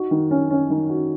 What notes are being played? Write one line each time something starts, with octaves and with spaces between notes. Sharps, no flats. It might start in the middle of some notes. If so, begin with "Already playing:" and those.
Already playing: D#4 F#4
D#3
C#4
C#4
D#3
F#4